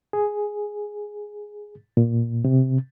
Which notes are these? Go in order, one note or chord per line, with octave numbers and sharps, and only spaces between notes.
G#4
A#2
C3